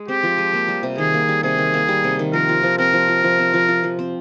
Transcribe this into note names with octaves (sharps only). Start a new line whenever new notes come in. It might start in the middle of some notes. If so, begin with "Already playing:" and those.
Already playing: G#3
C4 G4
F3
G#3
A#3
G3
C3
D#3 G#4
A#3
G3
C3 G#4
D#3
A#3
G3
C3
D#3
F3 A#4
F4
F3
C4 A#4
F3
F4
F3
C4
F3
F4
F3
C4